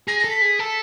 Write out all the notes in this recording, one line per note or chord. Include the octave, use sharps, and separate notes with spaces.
G#4 A#6
A4 A#6
B6
G#4
A4